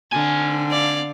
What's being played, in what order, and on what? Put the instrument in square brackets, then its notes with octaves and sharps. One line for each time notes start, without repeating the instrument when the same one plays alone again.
[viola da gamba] D3 [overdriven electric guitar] C4 G#5
[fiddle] D5 F5